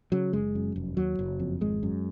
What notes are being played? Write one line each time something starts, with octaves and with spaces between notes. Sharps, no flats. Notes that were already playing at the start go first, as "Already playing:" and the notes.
C#3 F#3
F#1 G#3
F#2
F1
D#2 F#3
F#1
F2
G#1 G#3
F#2